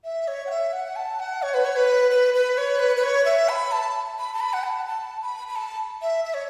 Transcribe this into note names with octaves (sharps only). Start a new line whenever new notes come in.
E5
C#5
F#5
E5
F#5
A5
F#5
C#5
B4
C#5
B4
B4
B4
C#5
B4
B4
C#5
E5
B5
A5
B5
A5
B5
F#5
A5
A5
B5
B5
A5
E5
E5
C#5